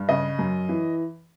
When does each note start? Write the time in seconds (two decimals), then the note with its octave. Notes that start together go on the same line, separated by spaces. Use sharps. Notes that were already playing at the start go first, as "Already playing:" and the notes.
Already playing: G2
0.09 C#3 D#5
0.39 F#2
0.69 E3